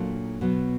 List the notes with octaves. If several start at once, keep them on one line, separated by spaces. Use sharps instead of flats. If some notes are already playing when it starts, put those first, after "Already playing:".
Already playing: A#2 F#3 A3 D4 F4
B2 F#3 B3